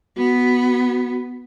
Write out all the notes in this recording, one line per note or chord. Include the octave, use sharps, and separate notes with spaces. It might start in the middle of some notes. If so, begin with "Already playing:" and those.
B3 F#4